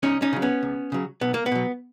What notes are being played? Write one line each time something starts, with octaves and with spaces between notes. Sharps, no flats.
C#2 C#4 D#4
C#4 D#4
C#3 F#3
B3 C#4
C#2
C#3 F#3
B1 B3
A#3
B3
B2 F#3